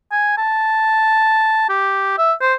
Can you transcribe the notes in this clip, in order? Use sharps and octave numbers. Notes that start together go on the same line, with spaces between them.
G#5
A5
G4
E5
C5